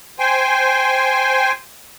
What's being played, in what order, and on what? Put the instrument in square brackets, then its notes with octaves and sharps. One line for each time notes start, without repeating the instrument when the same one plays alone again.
[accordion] C5 G5 G#5